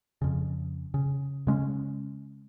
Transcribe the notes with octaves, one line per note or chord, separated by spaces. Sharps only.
F2 C#3
C#3
C#3 G#3 C#4